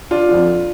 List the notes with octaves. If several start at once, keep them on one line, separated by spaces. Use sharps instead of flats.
D4 F4
F2 D3 F3